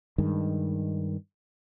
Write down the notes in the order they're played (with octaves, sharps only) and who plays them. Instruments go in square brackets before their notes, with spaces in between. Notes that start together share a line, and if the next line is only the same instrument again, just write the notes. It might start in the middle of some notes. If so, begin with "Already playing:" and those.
[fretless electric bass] G2 D#3 G#3